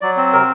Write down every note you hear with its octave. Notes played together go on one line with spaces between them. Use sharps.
F#3 D5
C4
C3 A#4